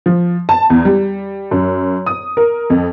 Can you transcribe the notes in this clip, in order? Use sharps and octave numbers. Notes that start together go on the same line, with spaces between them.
F3
A5
E2
G3
F#2
D#6
A#4
F2